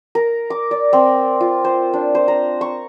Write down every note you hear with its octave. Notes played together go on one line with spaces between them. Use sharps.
A#4
D6
D5
C4
F4
C5
D4
C5
A#5
C#6